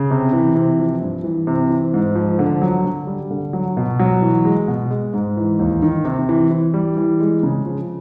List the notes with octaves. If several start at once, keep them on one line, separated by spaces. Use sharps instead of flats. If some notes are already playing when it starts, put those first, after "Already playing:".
Already playing: C#3
C3
E3
C3
F3
G2
E3
C3
E3
G#2
F3
D3
F#3
D3
G3
D3
F#3
B2
F#3
E3
G#3
B2
G#3
G#2
E3
D#2
D#3
C3
E3
E3
G3
E3
G#3
C#3
F3